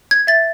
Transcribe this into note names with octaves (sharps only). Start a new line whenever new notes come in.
G#6
E5 A6